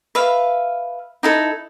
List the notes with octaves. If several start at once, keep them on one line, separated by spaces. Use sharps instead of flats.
B4 E5 F5
D#4 E4 A4